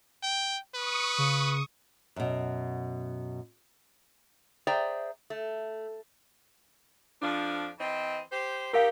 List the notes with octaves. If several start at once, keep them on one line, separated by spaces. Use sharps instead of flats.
G5
B4 C#6 D#6
C#3
F#2 B2
G#4 C5 D5 E5 G5 A#5
A3
F2 F3 D4
E3 C4 D#5
G4 C5
D#4 G4 A#4 F5